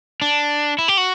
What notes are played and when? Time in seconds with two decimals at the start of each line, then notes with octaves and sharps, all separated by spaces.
0.22 D4
0.79 E4
0.88 G4
0.97 F#4